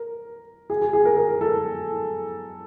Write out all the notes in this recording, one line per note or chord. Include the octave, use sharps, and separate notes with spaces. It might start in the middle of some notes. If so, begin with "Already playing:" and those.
Already playing: A#4
G#4
G#4
G#4
A#4
A#4
A4